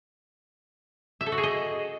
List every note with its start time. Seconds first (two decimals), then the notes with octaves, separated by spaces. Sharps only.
1.21 E5
1.26 A4
1.32 F#4
1.38 G#4
1.43 D#5